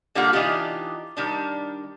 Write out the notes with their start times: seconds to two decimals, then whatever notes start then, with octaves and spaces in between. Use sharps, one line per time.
0.15 D3 G3 A#3 D4 F4 F#5
0.33 E3 D4 D#4 F4 G4
1.17 D#3 G3 D4